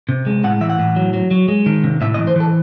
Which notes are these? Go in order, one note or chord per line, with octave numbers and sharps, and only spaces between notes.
C3
G#3
A2 F#5
E3 E5
F#5
A2
F#3
F#3
F#3
G#3
D#3
C3
A2 E5
D#5
E3
C5
E3 A4